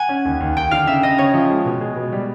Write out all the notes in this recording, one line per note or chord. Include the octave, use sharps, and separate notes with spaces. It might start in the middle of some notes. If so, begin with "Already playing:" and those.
Already playing: F#5 G#5
C#4
D#2
D#2
D#2 G5
D3 F5
C#3 E5
C#3 D#5
C#3 C#5
F3
G#3
B2
G#3
B2
G3